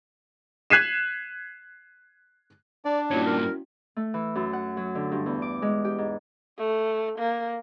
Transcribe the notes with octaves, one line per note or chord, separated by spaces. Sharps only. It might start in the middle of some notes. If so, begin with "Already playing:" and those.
F#6 G#6 B6 C7 D#7 E7
D4 D5
G2 A#2 C#4 E4 F#4 C#5
A#4
A3
E3
F#2
F#5
F#3
D3
G2
E2
D6
G#3
G4
G#2
A3
A#3